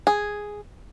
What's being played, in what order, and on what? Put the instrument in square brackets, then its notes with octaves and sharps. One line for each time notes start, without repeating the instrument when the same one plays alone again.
[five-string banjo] G#4